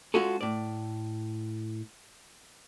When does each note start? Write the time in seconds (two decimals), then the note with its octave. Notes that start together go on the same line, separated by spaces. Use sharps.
0.14 G#3 C#4 F4 F#4 G#4 A4
0.41 A2 D5